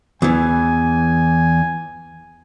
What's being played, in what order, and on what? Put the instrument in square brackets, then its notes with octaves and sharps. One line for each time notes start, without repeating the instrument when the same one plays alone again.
[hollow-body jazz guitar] E2 E3 [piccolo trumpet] G#5